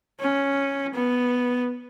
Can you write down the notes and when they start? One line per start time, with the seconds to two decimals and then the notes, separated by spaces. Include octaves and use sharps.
0.20 C#4
0.94 B3